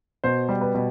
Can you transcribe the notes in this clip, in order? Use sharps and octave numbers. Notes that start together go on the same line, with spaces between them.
B2 C5
G3
B4
B2